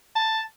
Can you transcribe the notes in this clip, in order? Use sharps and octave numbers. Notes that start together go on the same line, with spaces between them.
A5